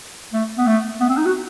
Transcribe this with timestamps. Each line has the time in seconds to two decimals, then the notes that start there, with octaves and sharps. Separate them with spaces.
0.33 A3
0.58 B3
0.67 A3
1.00 B3
1.09 C4
1.17 D#4
1.26 F#4